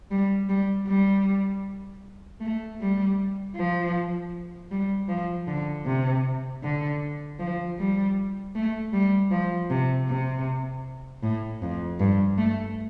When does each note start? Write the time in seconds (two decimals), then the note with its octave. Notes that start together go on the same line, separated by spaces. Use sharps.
0.10 G3
0.49 G3
0.88 G3
2.40 A3
2.79 G3
3.56 F3
4.71 G3
5.08 F3
5.47 D3
5.86 C3
6.62 D3
7.39 F3
7.78 G3
8.55 A3
8.93 G3
9.31 F3
9.70 C3
10.08 C3
11.22 A2
11.62 F2
11.99 G2
12.38 A3